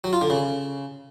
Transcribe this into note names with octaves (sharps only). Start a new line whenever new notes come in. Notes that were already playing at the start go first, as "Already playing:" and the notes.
F#3
F4
D3
C#3